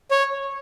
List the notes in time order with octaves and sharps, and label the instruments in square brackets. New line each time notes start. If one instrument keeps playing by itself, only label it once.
[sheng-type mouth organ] C#5